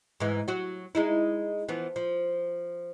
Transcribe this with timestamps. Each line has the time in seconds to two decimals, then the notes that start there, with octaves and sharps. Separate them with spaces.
0.20 G#2 E3
0.48 F#3 F#4
0.95 G#3 D#4 E4
1.68 E3 F3 B3
1.96 F3